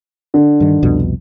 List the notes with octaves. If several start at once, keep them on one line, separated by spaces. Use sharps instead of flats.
D3
G2 D#3
C2 F2 B2